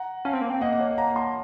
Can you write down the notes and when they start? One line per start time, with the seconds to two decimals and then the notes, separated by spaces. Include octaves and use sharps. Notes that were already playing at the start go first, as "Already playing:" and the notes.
Already playing: F#5 A#5
0.25 C#4 F5 A5
0.33 C4
0.41 A#3
0.50 C4
0.61 A#3 D#5 F#5
0.73 F#5
0.79 C#5 F5
0.98 F#5 A#5
1.16 A5 C6